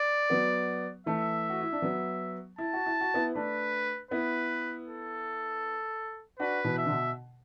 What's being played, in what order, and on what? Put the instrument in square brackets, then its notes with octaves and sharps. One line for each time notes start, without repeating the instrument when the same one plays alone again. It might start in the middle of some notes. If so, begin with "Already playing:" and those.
Already playing: [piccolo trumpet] D5
[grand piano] F#3 B3
[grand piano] E3 A3 [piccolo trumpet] E5
[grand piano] F#4
E4
D4
F#3 B3
[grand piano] E4 [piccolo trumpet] A5
[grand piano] F#4
E4
F#4
B3 E4
[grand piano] A3 D4 [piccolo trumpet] B4
[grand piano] B3 E4 [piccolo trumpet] B4
[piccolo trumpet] A4
[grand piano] D4 F#4 [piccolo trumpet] B4
[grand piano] B2 E3
[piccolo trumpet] E5
[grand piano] D3
B2